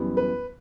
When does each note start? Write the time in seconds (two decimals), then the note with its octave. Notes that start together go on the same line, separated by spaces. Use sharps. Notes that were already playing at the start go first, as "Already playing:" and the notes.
Already playing: F#2 E3 G3 B3
0.17 B4